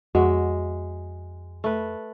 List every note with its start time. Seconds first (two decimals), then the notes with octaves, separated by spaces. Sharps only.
0.15 F2 G#3 F#4 E5
1.64 A3 B4